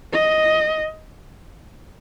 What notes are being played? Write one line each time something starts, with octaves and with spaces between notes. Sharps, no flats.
D#5